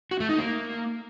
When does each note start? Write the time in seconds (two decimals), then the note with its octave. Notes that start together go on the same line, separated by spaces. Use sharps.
0.11 F#4
0.20 A3
0.29 D#4
0.38 A#3